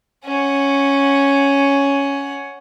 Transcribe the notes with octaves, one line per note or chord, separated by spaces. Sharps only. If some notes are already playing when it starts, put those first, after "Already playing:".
C#4 F#5